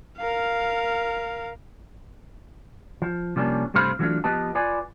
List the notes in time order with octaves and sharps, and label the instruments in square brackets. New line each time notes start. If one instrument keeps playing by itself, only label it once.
[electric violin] A#4 F5
[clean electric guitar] F3
C3 F3 G3 A#3 C#4 D4
G2 C3 A3 C5 F5 B5
E3 F#3 A3 A#3 D4 F4
F3 B3 G4 B4 D#5 A5
F4 B4 D5 G#5